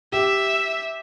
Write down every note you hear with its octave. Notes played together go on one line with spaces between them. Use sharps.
G4 E5